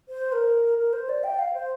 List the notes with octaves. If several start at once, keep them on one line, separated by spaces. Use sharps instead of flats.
C5
A#4
A#4
C5
D5
G5
F5
C5